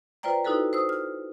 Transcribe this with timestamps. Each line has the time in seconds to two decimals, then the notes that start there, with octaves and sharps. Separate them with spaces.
0.23 F4 B4 C5 D5 G5 A#5
0.45 D#4 E4 F#4 A4 B4
0.73 C5 D#6 E6
0.89 F6